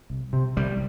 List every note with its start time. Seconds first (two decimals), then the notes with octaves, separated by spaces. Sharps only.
0.10 C2
0.33 C3
0.57 C2 G3